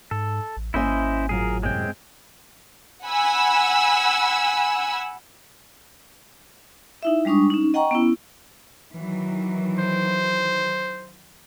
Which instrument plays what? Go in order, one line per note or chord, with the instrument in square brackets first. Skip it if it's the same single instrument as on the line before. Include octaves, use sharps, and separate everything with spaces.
[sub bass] G#2 [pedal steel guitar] A4
[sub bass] A1
[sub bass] G#1 [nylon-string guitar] A#3 C#4 E5 [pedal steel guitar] E4 C5 D#5
[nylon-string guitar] A2 F#3 F4 [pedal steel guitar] G#4 A#4
[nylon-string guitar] F#2 A2 C3 [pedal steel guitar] G#3 C4 G5
[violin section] F#5 G#5 B5 E6
[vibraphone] D#4 E4 E5
G3 G#3 D4 C#6 D#6
C#4 D#4
D#5 F#5 G5 A#5 C#6
B3 C#4 E4
[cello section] D#3 E3 F#3
[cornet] C5